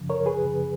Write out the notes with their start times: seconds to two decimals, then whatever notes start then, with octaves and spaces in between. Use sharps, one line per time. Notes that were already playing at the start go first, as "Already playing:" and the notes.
Already playing: F#2 C#3 F3
0.10 A#4 C#5
0.26 G#4 B4
0.42 F#2 C#3 F3